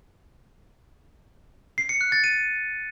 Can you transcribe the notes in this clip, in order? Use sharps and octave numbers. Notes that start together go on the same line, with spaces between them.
C7
C#7
F#6
A6
D#7